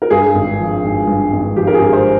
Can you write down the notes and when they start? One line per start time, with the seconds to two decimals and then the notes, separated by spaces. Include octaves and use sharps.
0.02 A#4
0.10 G2 G#4
0.35 G#1
0.59 F3
0.83 G#1
1.07 G2
1.33 G#1
1.56 F3 G4
1.67 A#4
1.74 G#4
1.81 G#1
1.93 G#4 C5